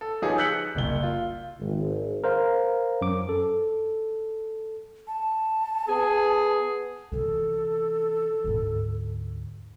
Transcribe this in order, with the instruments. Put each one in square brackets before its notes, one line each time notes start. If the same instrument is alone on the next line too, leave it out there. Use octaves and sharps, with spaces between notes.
[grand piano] A4
F3 D#4 G4 G#4 B4 C#5
E6 F#6 G6 B6 C#7 F#7
F#1 C2 G7
F4
[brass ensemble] G#1
[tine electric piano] A#4 C5 F5
F#2 D6
A4
[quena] A5
[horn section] B3 G#4
[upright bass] C3 E3 [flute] A4
[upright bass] D2 G#2